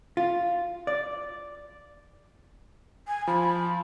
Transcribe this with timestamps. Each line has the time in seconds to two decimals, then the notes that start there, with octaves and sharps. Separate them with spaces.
0.17 F4
0.87 D5
3.08 G#5
3.27 F3 B5